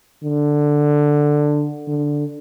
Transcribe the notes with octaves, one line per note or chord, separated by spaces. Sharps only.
D3
D3